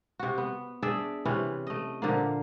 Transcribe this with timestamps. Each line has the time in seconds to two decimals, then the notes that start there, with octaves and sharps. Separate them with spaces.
0.19 C3 F#4
0.38 B3
0.82 D4 G#4 D5 E5
1.25 C3 E3 C#4 B4
1.67 A3 D#5
2.02 A#2 D3 F3 A#3